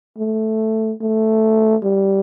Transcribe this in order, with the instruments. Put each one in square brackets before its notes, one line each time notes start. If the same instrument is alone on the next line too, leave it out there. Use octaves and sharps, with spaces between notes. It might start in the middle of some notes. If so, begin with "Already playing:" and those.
[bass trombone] A3
A3
G3